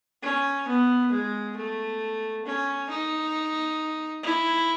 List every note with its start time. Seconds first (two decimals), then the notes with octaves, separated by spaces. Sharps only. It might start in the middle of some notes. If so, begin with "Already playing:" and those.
0.22 C#4
0.67 B3
1.11 G#3
1.56 A3
2.45 C#4
2.90 D#4
4.22 E4